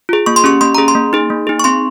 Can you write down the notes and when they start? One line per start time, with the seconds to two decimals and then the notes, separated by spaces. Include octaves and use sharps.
0.09 F4 G#4
0.26 A#3 C#6
0.36 C6
0.44 C#4 G4 C#6
0.61 A#3 C6
0.75 C#4 G#4 A#5
0.88 C6
0.95 A#3
1.13 D#4 G#4
1.30 A#3
1.47 D#4 G#4
1.59 C#6
1.64 C4 C6